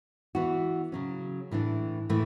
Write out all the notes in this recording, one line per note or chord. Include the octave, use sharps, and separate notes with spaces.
E3 B3 F#4
C#3 F#3 C#4
A2 E3 A3 D4
A2 E3 A3